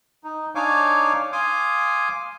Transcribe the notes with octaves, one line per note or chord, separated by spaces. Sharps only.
D#4
D4 D#4 C#5 F5 G#5 D6
F5 G#5 C6 D6 D#6